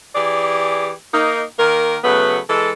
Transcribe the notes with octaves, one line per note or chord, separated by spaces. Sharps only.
E3 G4 G#4 D5
A#3 D#4
D#3 A#3 A#4
C#3 F#3 A3 B3 B4
E3 G#3 A4